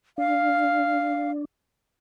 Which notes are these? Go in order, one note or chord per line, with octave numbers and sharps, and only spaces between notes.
D4 F5